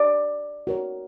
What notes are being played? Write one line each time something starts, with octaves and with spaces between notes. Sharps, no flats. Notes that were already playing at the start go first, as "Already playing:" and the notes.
Already playing: D5
F#4 A#4 C#5